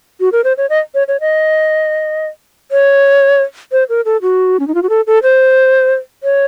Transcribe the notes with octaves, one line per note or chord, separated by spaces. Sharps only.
F#4
A#4
C5
C#5
D#5
C#5
C#5
D#5
C#5
C5
A#4
A4
F#4
C#4
D#4
F4
F#4
A4
A4
C5
C#5